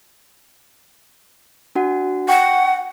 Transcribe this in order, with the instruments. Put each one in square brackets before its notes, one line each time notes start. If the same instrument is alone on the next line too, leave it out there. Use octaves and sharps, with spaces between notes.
[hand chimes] D4 F#4 F#5
[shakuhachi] F#5 [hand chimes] G5 C#6